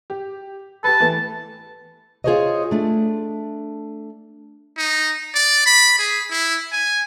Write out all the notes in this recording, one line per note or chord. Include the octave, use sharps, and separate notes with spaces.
G4
G4 B4 A5
E3 A3
F4 G#4 A4 C5 C#5 D#5
A3 D4
D#4
D5
B5
G#4
E4
G#5